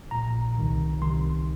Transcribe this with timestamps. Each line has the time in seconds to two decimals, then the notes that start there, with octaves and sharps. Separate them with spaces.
0.11 A#1 A#2 A#5
0.57 C2 C3 D#3
1.01 C2 C3 D#3 C6